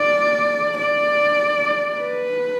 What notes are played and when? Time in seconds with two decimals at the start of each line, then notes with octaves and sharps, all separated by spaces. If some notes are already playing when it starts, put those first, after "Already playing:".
Already playing: D5
0.78 D5
1.98 B4